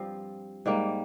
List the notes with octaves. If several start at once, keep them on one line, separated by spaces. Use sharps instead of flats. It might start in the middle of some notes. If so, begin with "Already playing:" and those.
Already playing: G2 F3 C4 F4
G#2 G3 A#3